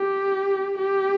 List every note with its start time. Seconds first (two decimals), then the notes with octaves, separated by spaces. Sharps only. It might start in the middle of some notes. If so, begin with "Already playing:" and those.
Already playing: G4
0.78 G4